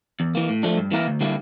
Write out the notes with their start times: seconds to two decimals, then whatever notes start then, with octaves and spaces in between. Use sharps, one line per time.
0.20 E2
0.35 E3 A#3
0.49 A2
0.63 F3 A3 D4
0.77 G2
0.92 E3 A#3 E4 A#4
1.07 D2
1.21 D3 G3 A#3 E4